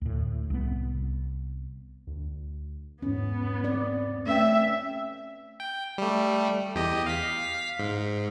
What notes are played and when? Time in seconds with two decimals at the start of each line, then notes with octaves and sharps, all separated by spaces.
0.02 D2 A2
0.50 C2 B3
2.07 D2
3.02 E2 G#2 B3 C#4
3.64 C4 D5
4.27 A3 C#4 B4 E5 G5
5.60 G5
5.98 G3 A3
6.75 E2 G4 D#5
7.06 F5 B6
7.79 G#2